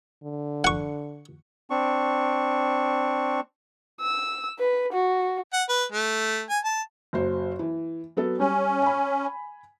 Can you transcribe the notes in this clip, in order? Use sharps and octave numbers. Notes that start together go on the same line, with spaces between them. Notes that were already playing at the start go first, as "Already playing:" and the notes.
D3
F#5 C#6
C4 D4 C#6
E6
B4
F#4
F#5
B4
A3
G#5
A5
F#1 F#3 C5
E3
F#3 B3 A4
G3 C#4
G#5 B5